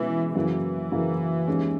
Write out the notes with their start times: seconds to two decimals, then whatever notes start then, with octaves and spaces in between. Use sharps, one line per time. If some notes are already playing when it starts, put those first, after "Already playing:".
Already playing: B2 E3 G#3 C#4 E4 G#4
0.35 F#2 C#3 E3 F#3 A#3 E4
0.92 F#2 C#3 F#3 A#3 E4
1.48 D#2 D#3 G#3 C#4